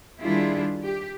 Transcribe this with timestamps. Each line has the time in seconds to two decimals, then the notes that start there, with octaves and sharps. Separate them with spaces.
0.20 D#3 G3 D4 E4 F4 G#4
0.83 G4